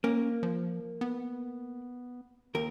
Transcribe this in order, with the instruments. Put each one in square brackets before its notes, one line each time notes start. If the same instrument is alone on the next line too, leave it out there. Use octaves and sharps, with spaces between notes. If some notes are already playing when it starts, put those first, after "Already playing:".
[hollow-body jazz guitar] A#3 [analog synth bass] C#4
[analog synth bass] F3
B3
[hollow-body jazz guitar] D#2 A#4